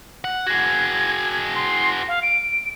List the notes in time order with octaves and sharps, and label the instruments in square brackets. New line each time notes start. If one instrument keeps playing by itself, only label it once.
[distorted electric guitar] F#5
[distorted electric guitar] F#4 G#4 [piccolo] G#6
[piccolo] C6
F5
D7